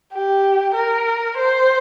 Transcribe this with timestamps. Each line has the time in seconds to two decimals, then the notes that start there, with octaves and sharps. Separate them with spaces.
0.13 G4
0.75 A#4
1.37 C5